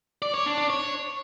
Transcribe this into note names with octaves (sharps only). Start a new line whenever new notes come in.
D5
C#5
D4
D4
C#5